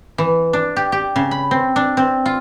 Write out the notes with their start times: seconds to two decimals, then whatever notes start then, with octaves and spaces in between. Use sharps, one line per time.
0.18 E3
0.53 D4
0.76 G4
0.92 G4
1.16 C#3
1.31 B5
1.51 C4
1.76 D4
1.97 C4
2.26 F4